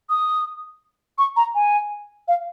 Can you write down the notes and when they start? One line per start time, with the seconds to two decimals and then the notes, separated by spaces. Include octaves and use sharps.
0.10 D#6
1.18 C#6
1.36 A#5
1.55 G#5
2.28 F5